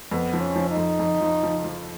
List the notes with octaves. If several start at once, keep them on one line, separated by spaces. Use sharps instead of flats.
F2 B3
F3
C#4
F3
D#4
F2
F2
F3
F3
F3